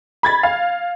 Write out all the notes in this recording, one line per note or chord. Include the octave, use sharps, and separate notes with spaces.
B5 G#6 A6
F5